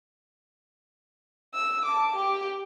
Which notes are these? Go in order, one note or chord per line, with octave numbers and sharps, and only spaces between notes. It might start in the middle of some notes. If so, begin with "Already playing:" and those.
E6
A5 D6
G4